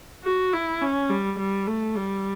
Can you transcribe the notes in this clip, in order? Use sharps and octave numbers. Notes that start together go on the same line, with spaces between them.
F#4
E4
C#4
G3
G3
A3
G3